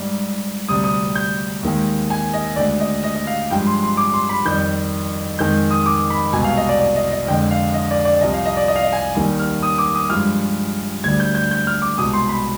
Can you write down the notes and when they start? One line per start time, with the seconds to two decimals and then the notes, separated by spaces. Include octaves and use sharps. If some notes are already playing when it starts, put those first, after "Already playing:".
Already playing: G#2 G3
0.69 D2 C3 G3 D#6
0.84 D#6
1.15 G6
1.63 D#2 D#3 G#3
2.10 G#5
2.34 D#5
2.56 D2 D3 G#3 D5
2.80 D#5
3.04 D#5
3.15 D#5
3.27 F5
3.50 G2 F3 G#3 G5
3.67 C6
3.83 C6
3.97 D6
4.14 C6
4.29 B5
4.45 F2 D#3 G3 G6
5.39 F2 D#3 G#3 G6
5.71 D#6
5.86 D6
6.10 B5
6.33 C2 B2 G#3 G#5
6.44 F5
6.57 D#5
6.69 D5
6.80 D5
6.96 D#5
7.11 D#5
7.27 F2 D3 G#3 G5
7.51 F5
7.74 D#5
7.91 D5
8.05 D5
8.21 C2 C3 F3 D#5
8.34 F5
8.45 D#5
8.57 D5
8.68 D#5
8.76 F5
8.83 D#5
8.92 G#5
9.15 D#2 D#3 G3
9.39 F6
9.63 D#6
9.78 D6
9.95 D#6
10.09 G2 F3 G#3 F6
11.04 D2 D3 G3 G#6
11.20 G6
11.35 G6
11.51 G6
11.67 F6
11.82 D6
11.98 C2 B2 G#3 D#6
12.13 C6
12.29 B5